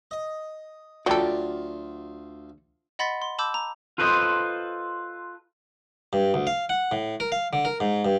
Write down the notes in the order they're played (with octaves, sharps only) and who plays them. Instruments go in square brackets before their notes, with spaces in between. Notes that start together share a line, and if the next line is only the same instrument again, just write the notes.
[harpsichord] D#5
[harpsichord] D2 F4 [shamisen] F#3 A4 [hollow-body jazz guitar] F#4 D5 G5
[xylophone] D#5 F#5 B5 C6 A6 B6
C6
A5 B5 D6 E6 G6
A#5
[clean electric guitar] F4 A4 B4 C5 D#5
[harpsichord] G2
D2
F5
F#5
A2
A#4
F5
D3
A#4
G#2
G2